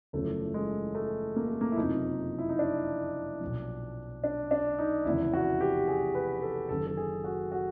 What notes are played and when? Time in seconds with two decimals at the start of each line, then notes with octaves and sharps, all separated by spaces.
0.13 F#1 E2 C#3 F3 A3
0.54 G#3
0.95 A3
1.36 A#3
1.48 A3
1.61 A#3
1.72 E4
1.77 F#1 F2 C3 F3 D#4
2.39 E4
2.49 D#4
2.59 D4
3.41 B1 A#2 F3
4.24 D4
4.51 D4
4.79 D#4
5.05 F1 E2 C#3 E4
5.33 F#4
5.61 G4
5.88 G#4
6.15 B4
6.42 A4
6.69 F#1 F#2 D#3 A4
6.87 A4
6.97 G#4
7.24 F#4
7.52 F#4